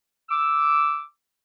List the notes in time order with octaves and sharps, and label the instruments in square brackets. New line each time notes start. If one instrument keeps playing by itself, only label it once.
[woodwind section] D6 E6